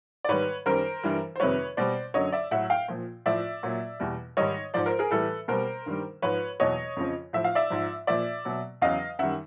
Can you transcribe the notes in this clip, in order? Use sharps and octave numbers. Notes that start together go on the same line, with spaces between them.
D5
G#2 D#3 G3 B4 C#5
F#2 D#3 G3 A#4 C5
G2 E3 G3
C5
F2 C3 D#3 G3 B4 C#5
B2 G3 C5 D5
F#2 D3 F#3 C#5 D#5
D5 E5
A2 F#3 E5 F#5
F5 G5
A#2 F3
A2 F3 D5 E5
A#2 F#3
E2 B2 G3
G#2 D#3 G3 C#5 D#5
G#2 F3 C5 D5
A#4 C5
G#4 A#4
A2 E3 G3 A4 B4
B2 G3 A#4 C5
G2 D#3 G3
G#2 F3 B4 C#5
E2 B2 F#3 C#5 D#5
F2 C#3 F3
A2 F3 E5
F5
D5 E5
G#2 F3
A#2 F3 D5 E5
B2 F#3
E2 C#3 F#3 D#5 F5
F#2 D#3 G3 E5 F#5